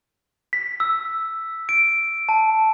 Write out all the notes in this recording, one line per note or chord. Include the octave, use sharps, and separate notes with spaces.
B6
E6
D7
A5